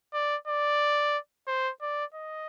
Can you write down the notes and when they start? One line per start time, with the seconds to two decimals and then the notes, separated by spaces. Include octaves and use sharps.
0.13 D5
0.48 D5
1.48 C5
1.82 D5
2.14 D#5